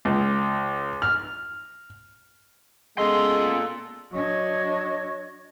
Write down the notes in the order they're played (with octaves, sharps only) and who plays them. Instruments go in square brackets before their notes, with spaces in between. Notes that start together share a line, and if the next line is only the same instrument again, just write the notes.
[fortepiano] C#2
F6
[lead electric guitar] A#2 C6 [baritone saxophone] G#3 [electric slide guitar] B3 C#4 D#5 [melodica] A4
[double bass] F#3 D4 [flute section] C#5 D#5 C#6